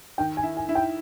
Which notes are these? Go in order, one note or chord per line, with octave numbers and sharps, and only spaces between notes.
D#3 G5
G#5
E4
G#5
E4
G5